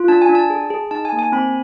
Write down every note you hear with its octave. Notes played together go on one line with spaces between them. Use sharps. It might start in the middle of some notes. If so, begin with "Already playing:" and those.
Already playing: F4
D4 A5
G#5
D4
A5
G#4
G#4
D#4 A5
G#5
A#3
G#5
C4 B5